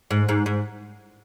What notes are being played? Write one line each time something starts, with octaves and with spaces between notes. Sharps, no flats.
G#2
G#2
G#2